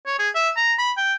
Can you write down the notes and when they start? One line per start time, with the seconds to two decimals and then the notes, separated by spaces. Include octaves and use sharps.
0.07 C#5
0.19 G#4
0.35 E5
0.57 A#5
0.79 B5
0.97 G5